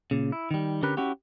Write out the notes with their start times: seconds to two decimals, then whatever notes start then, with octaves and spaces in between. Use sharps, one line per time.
0.11 A#2 C#3
0.32 E4
0.51 D#3 G3
0.83 D3 C#4 G4 A#4 B4
0.97 C#4 E4 F#4 G4